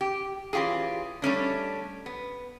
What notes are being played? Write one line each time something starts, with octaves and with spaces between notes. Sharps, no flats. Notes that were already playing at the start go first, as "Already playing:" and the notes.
G4
E3 C#4 F4 G4 G#4
G3 A3 C#4 D4
B3